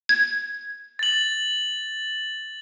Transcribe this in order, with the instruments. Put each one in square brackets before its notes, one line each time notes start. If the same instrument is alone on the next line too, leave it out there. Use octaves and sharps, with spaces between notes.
[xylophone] G#6
[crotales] A6 F#7